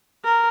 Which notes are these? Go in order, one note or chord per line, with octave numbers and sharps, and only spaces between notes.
A#4